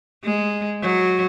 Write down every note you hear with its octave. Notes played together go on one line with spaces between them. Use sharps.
G#3
F#3